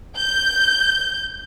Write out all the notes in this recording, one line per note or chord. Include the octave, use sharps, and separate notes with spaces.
G6